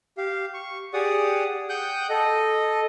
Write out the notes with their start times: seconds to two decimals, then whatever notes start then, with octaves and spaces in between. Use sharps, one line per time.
0.17 G4 F5
0.54 C#6
0.93 G4 G#4 D5 F#5 D#6
1.69 F#5 G5 D#6 F#6 G6
2.09 A4 D#5